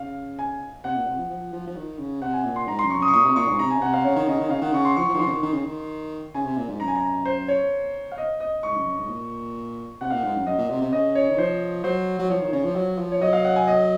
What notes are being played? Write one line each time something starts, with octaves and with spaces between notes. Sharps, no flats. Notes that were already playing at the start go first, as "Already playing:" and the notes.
Already playing: C#3 F5
G#5
C3 F#5
A#2
C3
F3
F3
F3
F3
D#3
C#3
C3 F#5
G#5
A#2
C6
G#2 A#5
C6
F#2
C#6
F#2 D#6
C#6
A#2 D#6
C3
A#2 C#6
G#2
C3 A#5
G#5
C#3
C3 F#5
F5
C#3 C#5
D#3
C#3 D#5
D#3
C#3 F5
D#3 F#5
C#3 C#6
C6
F3 C#6
F3
D#3
F3 C6
C#3
D#3
D#3
C#3
D#3
C#3 G#5
C3
A#2
G#2
F#2 A#5
G#5
A#5
C5
C#5
F5
D#5
D#5
G#2 C#6
F#2
F#2
G#2
A#2
C3 F#5
A#2 F5
G#2 F#5
F#2
F#2 D#5
A#2
C3
C3
C#3 D#5
C#5
D#3
F3 C5
F#3 C5
F#3
F3 C#5
D#3
C#3 C#5
F3
F#3
F3
C#5
F#3 D#5
F5
F#5
G#5
D#5